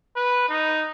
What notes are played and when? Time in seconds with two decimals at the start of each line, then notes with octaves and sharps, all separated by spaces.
0.16 B4
0.49 D#4